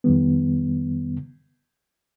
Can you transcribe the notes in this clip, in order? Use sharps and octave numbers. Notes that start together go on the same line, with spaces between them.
F2 D#3 G3 B3